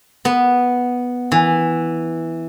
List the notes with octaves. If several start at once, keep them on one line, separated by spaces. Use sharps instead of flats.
B3
E3